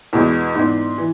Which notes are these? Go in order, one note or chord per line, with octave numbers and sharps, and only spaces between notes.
E2 B2 G#3
G#2 E3 B3 D4
E3